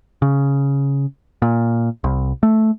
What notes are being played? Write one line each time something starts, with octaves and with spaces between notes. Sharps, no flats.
C#3
A#2
C2
A3